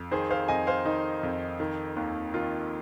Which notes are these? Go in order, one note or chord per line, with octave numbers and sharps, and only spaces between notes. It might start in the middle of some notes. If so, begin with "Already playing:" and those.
Already playing: F2
D#3 G#4 C5
C5 F5
F2 D#5 G#5
C5 F5
D#3 D#4
F2
D#3
D#2
D#3 F4